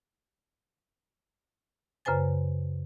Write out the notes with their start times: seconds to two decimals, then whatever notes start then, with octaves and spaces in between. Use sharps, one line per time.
2.05 F#2 C#3 B4 C5 G#5 A6